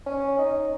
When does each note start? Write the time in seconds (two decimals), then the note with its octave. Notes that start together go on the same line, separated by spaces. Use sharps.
0.06 C#4
0.38 D#4